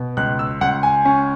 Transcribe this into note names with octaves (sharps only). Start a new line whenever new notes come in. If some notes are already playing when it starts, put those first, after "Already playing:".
Already playing: B2
C#2 F#6
E6
C#2 F#5
G#5
C#4